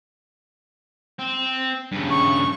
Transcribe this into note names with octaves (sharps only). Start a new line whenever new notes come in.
C4
G2 C#3
C#6